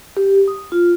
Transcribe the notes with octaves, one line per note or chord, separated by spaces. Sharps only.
G4
D#6
F4